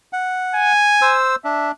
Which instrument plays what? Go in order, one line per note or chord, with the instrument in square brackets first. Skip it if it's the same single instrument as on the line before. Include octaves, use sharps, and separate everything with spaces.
[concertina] F#5
[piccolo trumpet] G#5
[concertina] C5 E6
[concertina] D4 [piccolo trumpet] E5